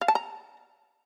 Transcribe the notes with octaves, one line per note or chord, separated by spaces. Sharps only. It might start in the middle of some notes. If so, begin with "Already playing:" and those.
F5
A5
A#5